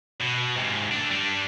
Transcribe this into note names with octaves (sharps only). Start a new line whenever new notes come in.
B2
G#2 C3
A3 D4
G3 D4